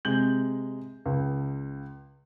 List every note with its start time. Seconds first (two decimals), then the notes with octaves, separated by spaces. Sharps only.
0.05 C3 G#3 G6 F#7
1.05 C#2